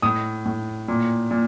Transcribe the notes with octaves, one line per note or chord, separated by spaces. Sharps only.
A2 D#6
A2
A#2
A#2